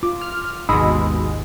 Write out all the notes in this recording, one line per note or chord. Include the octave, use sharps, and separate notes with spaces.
F4 D6
F6
G#1 D#2 B2 G#3 D#4 B5 D#6 E6